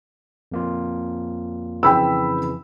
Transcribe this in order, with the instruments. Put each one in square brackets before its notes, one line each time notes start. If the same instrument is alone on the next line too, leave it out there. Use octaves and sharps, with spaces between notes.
[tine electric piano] F2 A#3 F4
[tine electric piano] F2 C#3 E3 [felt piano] G5 B5 E6